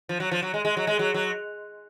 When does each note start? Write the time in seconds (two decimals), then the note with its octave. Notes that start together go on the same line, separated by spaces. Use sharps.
0.09 F3
0.20 F#3
0.32 F3
0.42 F#3
0.54 G#3
0.65 G#3
0.77 F#3
0.87 G#3
0.99 F#3
1.14 F#3